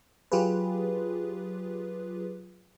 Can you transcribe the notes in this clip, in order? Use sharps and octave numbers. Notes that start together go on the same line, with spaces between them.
F#3 F4 G4 G#4 B4